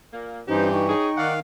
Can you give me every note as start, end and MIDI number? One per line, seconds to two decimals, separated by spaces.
0.13 0.42 46
0.13 0.42 58
0.48 0.94 43
0.48 0.94 52
0.48 0.70 61
0.48 0.69 63
0.48 0.84 67
0.48 0.69 72
0.73 0.87 63
0.73 1.31 79
0.73 1.31 85
0.89 1.09 61
0.89 1.30 63
0.89 1.09 68
1.18 1.40 51
1.18 1.33 74
1.18 1.33 75
1.18 1.40 77
1.18 1.33 78